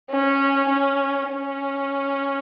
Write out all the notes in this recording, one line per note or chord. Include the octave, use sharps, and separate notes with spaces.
C#4
C#4
C#4